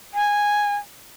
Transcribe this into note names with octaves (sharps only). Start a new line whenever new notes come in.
G#5